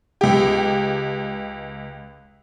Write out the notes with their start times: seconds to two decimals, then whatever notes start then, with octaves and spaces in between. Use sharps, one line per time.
0.21 C#2 G4